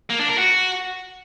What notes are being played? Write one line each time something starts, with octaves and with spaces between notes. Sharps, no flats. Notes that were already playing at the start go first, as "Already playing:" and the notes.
A#3
D4
A#4
F#4